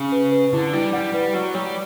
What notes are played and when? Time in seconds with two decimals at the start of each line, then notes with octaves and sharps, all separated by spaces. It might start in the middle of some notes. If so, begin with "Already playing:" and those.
Already playing: C#3
0.12 B4
0.32 B4
0.53 D3 E4
0.73 G3 E4
0.93 G3 F#5
1.13 G3 B4
1.34 F#3 F#5
1.54 G3 C#5